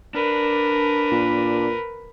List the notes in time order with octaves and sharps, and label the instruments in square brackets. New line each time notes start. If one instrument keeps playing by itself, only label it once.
[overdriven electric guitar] D4 [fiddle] A#4 B4
[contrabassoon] A#2